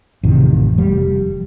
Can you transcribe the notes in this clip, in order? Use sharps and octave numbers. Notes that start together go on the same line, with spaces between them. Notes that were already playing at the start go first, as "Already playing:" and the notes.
A1 F2 C3 D#3
F1 F3 G3